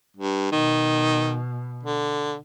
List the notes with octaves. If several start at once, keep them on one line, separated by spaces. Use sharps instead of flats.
G2
B2 D#3
D3